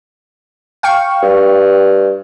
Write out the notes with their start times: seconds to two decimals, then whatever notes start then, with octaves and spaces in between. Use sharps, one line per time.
0.83 F5 G5 C#6
1.23 G2